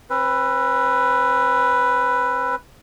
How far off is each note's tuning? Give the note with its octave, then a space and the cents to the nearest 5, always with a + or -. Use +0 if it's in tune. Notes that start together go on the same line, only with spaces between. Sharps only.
C4 +40 B4 +0